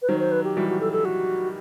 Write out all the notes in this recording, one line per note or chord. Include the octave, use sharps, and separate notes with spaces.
B4
D#3 F#3 C5
C5
B4
G4
E3 G3 F#4
F#4
A4
A4
F#4